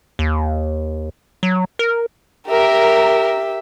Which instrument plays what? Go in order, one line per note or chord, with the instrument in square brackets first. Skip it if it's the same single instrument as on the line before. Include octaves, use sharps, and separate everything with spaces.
[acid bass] D#2
F#3
A#4
[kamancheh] G4 E5 [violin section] A#4